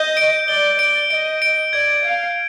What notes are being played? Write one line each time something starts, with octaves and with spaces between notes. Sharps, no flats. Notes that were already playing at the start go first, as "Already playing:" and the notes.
Already playing: D#5 G6
D7
D5 G7
D5 D7
D#5 D7
D7
D5 G#6
F5 G#6